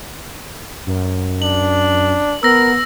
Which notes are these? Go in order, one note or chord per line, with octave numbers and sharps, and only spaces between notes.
F#2
D4 F#7
B3 A#4 E6 A#6